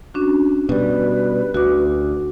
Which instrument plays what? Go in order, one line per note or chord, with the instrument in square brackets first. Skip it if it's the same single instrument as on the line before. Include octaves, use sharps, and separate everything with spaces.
[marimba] C#4 D4 F#4
[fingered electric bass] B2 G3 [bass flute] B4
[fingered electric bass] D2 [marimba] F#4 D6